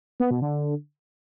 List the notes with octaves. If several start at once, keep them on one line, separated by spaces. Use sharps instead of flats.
B3
B2
D3